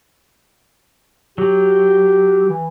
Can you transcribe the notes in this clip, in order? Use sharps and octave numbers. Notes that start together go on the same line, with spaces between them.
F#3 G4
E3